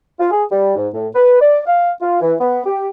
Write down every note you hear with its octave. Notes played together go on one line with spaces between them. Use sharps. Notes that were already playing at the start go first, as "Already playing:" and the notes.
F4
G#4
G3
G#2
A2
B4
D5
F5
F4
E3
B3
G4